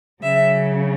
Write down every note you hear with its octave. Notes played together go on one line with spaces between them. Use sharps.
C#3 F#3 E5